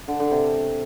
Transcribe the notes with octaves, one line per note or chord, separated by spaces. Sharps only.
D3
D3
C3